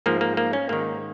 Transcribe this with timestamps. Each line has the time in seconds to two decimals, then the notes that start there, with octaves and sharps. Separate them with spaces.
0.06 G#2 F3 A#3
0.21 A#3
0.37 A#3
0.53 C#4
0.69 G#2 D#3 A#3